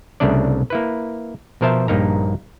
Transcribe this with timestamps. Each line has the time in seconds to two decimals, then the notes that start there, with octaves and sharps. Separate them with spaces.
0.20 C2 C#3 A3 D4 D5
0.70 A#3 E4 B4
1.61 B2 F3 A#4 C5 E5 A5
1.88 A#1 G2 A#3 D#4 A#4 A#5